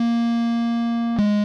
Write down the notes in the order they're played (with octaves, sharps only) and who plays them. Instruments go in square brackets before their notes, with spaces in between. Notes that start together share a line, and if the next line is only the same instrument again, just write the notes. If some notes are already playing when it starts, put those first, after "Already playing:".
Already playing: [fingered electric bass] A#3
G#3